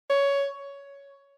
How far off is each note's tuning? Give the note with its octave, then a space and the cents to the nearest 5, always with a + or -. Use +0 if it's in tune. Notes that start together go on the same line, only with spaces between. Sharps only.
C#5 +10
C#5 +10